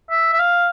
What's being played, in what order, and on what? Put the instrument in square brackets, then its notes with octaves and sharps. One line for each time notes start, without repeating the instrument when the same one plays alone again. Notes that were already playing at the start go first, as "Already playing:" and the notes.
[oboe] E5
E5
F5